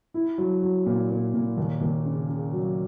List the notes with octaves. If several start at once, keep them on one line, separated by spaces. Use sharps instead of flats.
E4
F#3
F#3
A#2
A#2
A#2
D#2
D#2
C#3
C#3
F#3